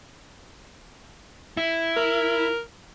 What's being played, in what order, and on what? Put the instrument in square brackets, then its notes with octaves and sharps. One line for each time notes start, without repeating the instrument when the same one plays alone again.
[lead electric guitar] E4
[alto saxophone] A#4